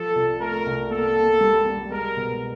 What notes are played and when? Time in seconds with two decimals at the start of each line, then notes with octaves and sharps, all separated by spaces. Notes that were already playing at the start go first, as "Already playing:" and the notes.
Already playing: F3 A4
0.16 C2
0.41 A3 A#4
0.66 C2
0.91 A#3 A4
1.16 A#3
1.41 G3
1.66 G3
1.91 G#3 A#4
2.17 B2